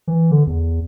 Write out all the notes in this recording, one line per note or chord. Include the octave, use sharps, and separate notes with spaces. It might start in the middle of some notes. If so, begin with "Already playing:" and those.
E3
D3
E2